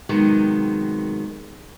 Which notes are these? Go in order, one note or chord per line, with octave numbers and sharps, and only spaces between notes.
C3 D#3 F#3 G#3 B3